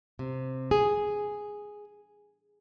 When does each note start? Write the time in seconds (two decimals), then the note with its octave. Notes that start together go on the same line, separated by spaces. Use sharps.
0.19 C3
0.71 G#4